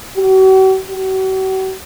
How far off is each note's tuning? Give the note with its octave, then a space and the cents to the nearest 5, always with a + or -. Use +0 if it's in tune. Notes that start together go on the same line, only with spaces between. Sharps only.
F#4 +45
F#4 +45